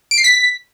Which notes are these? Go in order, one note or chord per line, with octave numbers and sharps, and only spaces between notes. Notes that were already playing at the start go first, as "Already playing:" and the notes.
D7
C7
B6